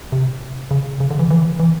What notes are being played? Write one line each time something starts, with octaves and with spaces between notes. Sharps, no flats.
C3
C#3
C#3
D3
E3
E3
E3